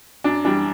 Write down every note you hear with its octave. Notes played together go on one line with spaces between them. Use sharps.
F#2 D4
E3 G3 D4